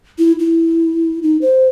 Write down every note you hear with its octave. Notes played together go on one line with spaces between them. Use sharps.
E4
E4
D#4
C5